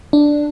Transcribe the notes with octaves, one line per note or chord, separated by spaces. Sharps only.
D4